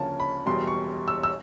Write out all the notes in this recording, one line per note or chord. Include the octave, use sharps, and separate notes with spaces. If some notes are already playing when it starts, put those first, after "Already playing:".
Already playing: D2 C#3 F3 A#3 C#4 A5
B5
E1 E2 B2 G3 C6
C#6
E6
E6